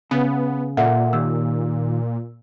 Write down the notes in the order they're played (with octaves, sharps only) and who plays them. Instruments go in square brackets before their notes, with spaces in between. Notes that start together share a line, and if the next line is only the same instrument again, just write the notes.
[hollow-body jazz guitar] C#3 [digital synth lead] B3
[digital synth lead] A#2 [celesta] A4 E5 F#5
[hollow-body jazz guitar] D#2 [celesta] E6